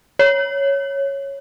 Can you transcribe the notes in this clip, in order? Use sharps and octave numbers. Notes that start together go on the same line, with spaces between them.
C#5